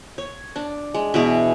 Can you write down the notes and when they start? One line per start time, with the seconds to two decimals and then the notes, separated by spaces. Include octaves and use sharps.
0.18 C#5
0.56 D4
0.94 G#3
1.14 B2 E3 F#4 G#4